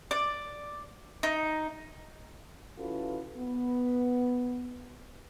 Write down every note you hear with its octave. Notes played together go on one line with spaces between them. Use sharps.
D5
D#4
E3 C#4 F4 F#4 A4 B4
B3